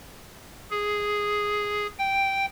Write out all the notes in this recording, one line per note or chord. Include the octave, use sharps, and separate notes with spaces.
G#4
G5